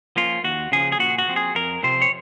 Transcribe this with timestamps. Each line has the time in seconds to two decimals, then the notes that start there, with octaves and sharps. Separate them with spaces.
0.16 F3 A#3 C#4 F4
0.44 D#2 F#4
0.72 C#3 F3 G#4
0.92 G#4
0.99 A#2 F#4
1.18 F#4
1.28 F3 C4
1.36 G#4
1.55 F2 A#4
1.83 C3 F3 C4 C5
2.02 C#5